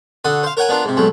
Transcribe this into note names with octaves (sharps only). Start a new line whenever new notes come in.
D3 F#4 A4 D#6
C5 F5
A#4 C#5 F#5 G#5
B3 D4 F4 A#4
G#2 C3
B1 A2 G#3 A3